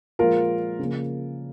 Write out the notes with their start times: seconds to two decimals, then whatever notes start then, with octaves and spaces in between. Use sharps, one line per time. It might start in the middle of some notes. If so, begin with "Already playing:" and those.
0.19 A#2 F3 G#3 F4 A#4
0.79 C#3 F3 A#3